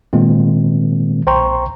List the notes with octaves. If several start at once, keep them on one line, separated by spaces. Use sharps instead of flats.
A#2 D#3 G#3 A#3 C4
B1 C5 G5 A#5 C6 C#6